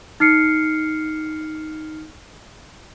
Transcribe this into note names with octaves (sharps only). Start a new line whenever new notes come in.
D#4 F6 C7 C#7